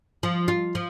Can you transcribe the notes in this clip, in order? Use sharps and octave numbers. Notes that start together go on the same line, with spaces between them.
F3
F4
F3